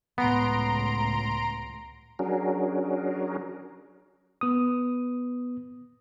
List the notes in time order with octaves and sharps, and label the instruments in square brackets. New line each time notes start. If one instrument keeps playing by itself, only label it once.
[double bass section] C#2 A2 [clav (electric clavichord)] B3 [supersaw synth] A#5 C6 D7
[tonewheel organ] F#3 C#4 D4 F#4 G#4 A#4
[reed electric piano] B3 D#6